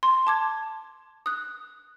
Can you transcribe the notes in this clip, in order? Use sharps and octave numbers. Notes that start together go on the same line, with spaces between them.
C6
A5 D6 G#6
D#6 F#6